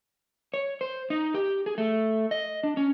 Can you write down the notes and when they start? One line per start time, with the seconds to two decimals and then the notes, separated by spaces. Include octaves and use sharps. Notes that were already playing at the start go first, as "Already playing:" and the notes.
0.54 C#5
0.81 C5
1.10 D#4
1.34 G4
1.66 G#4
1.78 A3
2.31 D#5
2.64 D4
2.77 C#4